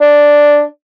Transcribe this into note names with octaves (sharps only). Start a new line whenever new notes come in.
D4